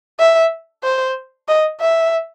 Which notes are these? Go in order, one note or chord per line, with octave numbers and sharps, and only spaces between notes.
E5
C5
D#5
E5